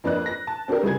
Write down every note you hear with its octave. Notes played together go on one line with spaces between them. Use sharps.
F2 A#3 D4 B4 D#5 F#6
A#6
A5
C4 D4 F#4 G4 A#4
C2 C#3 G#4 G#6